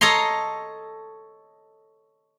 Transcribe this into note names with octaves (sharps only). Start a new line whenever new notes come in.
A4 C#5 D#5 A#5 C6